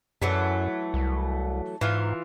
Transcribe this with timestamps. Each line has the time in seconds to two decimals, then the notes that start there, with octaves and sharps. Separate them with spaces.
0.22 F#2 E3 F#3 A3
0.94 C2
1.81 G#2 E3 F4 F5